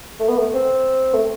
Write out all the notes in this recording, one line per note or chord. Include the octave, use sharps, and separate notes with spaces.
A3
B3
A3
C4
A3